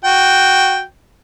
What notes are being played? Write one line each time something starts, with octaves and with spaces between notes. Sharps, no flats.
F#4 G5